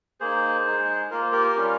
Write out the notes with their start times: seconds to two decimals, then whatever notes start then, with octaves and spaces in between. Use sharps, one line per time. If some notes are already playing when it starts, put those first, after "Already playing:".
0.20 A#3 D#4 G#4 C5
0.67 G#3 D#4
1.11 A#3 F4 A#4
1.21 C5
1.32 G4 A#4
1.56 G3 C#4 F4